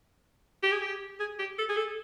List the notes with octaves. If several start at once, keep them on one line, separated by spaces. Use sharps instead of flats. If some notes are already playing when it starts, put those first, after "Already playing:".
G4
G#4
G4
G#4
G4
A4
G#4
A4